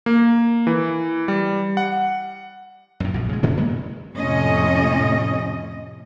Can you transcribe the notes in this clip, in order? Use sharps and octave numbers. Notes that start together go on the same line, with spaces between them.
A#3
E3
G3
F#5
F#2 A2
A#1 B2
C#3 G#3
F#2 D3 C#4
A#2 G#3 A#3 B3
F2 A2 C3 C#4 D#5